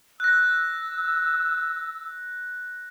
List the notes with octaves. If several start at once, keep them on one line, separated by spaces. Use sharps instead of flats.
E6 F#6 A#6